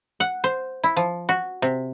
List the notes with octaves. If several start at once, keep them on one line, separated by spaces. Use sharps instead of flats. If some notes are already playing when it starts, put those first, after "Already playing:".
F#5
C5
E4
F3
F#4
C3